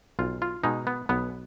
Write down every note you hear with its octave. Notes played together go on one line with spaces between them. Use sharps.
B1 F4
F4
B2 G#3 D#4
B3
B1 B3